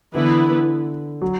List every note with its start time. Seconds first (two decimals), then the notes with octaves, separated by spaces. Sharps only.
0.14 D3 E3 B3 E4 B4
1.22 F#3